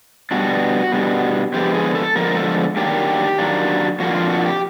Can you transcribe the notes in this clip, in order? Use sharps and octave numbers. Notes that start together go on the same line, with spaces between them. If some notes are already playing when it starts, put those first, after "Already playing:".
B2 G3 B3 D4 F#4
B2 G3 B3 D4
D3 F3 G#3 B3 G4
G#4
A4
D3 F3 G#3 B3 A#4
A4
D#3 F#3 A#3 D4 G4
D#3 F#3 A#3 D4
F2 D3 F3 A#3 F#4
F4
F#4
G4